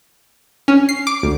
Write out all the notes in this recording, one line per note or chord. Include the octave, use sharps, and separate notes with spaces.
C#4
C7
D6
D2